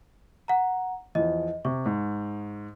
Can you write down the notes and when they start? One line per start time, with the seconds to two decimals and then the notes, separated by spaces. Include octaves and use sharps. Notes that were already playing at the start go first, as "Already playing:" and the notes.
0.48 F#5 A#5
1.15 E2 F3 D#5
1.65 C3 C#6
1.86 G#2